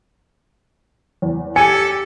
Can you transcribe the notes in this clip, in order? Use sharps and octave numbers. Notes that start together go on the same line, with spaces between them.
E2
G4 A4 G#5 C#7